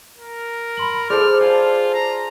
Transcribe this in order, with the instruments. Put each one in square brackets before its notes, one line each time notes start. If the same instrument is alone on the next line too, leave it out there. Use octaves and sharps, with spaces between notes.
[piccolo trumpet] A#4
[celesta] B5 C6 F#7
[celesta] G#4 [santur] A4 C5 D5 [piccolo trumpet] F6
[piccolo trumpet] F4 [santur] G#5 A5
[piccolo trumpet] A#5